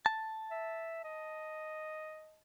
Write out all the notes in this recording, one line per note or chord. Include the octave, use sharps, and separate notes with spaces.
A5
E5
D#5